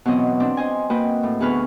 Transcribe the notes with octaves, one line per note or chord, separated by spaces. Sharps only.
B2 E3 F#3 C4 D#5
C4 D4
C5 D#5 G#5
A#3 F#4 B4 D#5 G5
A2
D2 B3 G#4 B4 C#6 F6